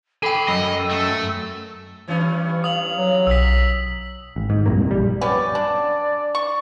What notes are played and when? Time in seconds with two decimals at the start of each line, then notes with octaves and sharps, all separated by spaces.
0.23 A4 G5 G#5 B5 C7
0.48 F#2 D#5 E6
0.91 A3
2.08 G2 E3 C#4
2.64 F5 D#6 F#7
2.94 F#3
3.27 B1 E6 B6
4.36 G#1
4.50 G#2
4.66 C2 F#2 A#2 A#3
4.91 A#1 G3
5.21 B3 C#4 G4 D5
5.55 D4
6.35 C#6